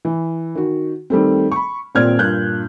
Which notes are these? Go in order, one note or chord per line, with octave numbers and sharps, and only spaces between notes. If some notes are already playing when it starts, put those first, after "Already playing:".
E3
D#3 F#4
D#3 G3 A3 C4
B5 C#6
D#1 A#2 C4 D5 F6 G#6
G2 A#2 F#6 G6